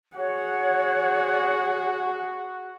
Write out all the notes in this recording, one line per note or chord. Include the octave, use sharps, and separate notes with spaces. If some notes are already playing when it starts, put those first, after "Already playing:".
F#4 G#4 C#5 F#5